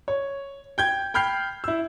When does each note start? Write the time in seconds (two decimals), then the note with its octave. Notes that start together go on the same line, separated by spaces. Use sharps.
0.08 C#5
0.78 G5 G6 G#6
1.14 G5 B5 F6 G6 C7
1.64 E4 E6